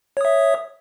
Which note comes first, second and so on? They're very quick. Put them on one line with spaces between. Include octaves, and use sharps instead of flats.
C#5 D#6 E5